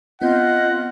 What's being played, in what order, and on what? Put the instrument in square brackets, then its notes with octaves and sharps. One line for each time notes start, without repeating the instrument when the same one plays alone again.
[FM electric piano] B3 C4 G6 [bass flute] F4 [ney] D#5 [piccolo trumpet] F#5